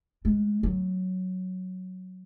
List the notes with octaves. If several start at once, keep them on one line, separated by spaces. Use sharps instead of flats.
G#3
F#3